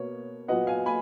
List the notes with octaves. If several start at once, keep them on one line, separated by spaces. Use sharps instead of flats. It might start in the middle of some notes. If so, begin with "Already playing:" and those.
Already playing: B2 A#3 C#5
A#2 F#3 B3 D#5 F#5
F5 G#5
G#5 B5